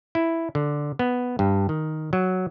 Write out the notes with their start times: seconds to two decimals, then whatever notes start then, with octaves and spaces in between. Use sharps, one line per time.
0.15 E4
0.55 D3
0.99 B3
1.39 G2
1.69 D#3
2.13 F#3